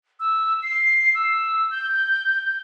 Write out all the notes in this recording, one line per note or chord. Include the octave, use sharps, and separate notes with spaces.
E6
C7
E6
G6